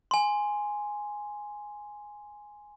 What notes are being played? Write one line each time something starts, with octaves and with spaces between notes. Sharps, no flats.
G#5 C6